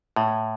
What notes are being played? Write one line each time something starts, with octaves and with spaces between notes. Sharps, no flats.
A2